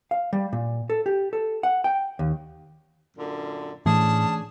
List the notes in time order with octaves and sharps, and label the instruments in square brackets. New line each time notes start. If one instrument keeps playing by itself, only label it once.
[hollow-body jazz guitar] F5
G3
A#2
A4
G4
A4
F#5
G5
D#2
[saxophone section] F#2 A#2 D3
[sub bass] A2 [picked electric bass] E3 A3 [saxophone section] C#4 D4 G#4 [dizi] A5